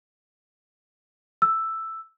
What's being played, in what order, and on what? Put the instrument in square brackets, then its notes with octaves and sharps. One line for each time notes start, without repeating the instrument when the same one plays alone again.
[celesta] E6